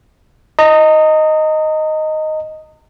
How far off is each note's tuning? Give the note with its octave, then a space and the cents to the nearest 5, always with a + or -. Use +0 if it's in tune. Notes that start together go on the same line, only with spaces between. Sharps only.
D#5 +0 A#5 -35